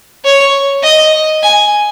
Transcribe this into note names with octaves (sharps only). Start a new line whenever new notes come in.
C#5
D#5
G#5